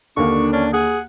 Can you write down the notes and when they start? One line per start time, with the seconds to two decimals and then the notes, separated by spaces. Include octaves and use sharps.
0.17 D#2 D3 A#3 D4 C#6
0.53 C#4 D4
0.74 G#4 F#5